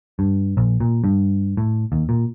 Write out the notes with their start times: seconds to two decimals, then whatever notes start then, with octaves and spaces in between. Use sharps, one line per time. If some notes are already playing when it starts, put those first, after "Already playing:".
0.19 G2
0.57 A#1
0.80 A#2
1.04 G2
1.57 A2
1.92 D#2
2.09 A#2